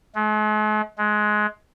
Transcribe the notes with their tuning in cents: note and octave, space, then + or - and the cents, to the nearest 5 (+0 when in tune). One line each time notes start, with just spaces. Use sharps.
G#3 +45
G#3 +20